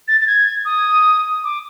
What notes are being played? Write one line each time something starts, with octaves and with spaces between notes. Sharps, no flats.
A6
A6
G#6
D#6
D6